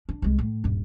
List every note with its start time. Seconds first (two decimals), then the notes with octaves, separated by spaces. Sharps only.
0.09 D4
0.22 C2 G#3
0.39 A2
0.64 D#1 G2